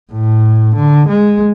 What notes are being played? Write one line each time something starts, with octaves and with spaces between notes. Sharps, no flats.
A2
D3
G#3